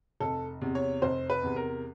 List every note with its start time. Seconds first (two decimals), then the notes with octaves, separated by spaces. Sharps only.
0.20 F1 A4
0.61 E2 C3
0.75 C#5
1.02 F1 C5
1.30 B4
1.43 E2 C3
1.56 A#4